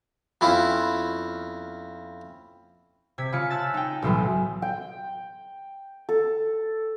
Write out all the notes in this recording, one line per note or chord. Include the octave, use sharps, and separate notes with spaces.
F2 B3 C#4 E4 F4
C3 G#6 B6
C#3 F4 C#7
A5 E6 F#6 A6
D#4 G5
B1 A2 C#3 E3 F#3 G#3
G5
A4